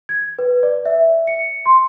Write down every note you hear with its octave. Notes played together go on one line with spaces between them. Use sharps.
G#6
B4
D5
E5
C#7
C6